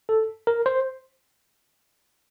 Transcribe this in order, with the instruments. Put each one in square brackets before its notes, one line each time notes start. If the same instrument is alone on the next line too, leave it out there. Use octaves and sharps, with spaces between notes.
[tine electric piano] A4
A#4
C5